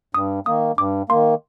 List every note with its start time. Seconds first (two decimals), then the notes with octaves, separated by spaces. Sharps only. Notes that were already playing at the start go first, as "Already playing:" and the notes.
0.14 G2 D#6
0.46 D#3 A#3 D#6
0.77 G2 D6
1.09 D#3 A#3 C6